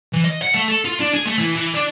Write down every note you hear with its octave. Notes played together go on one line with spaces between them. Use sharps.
E3
D#5
F#5
A3
A4
F4
D4
G#4
A3
E3
E3
D4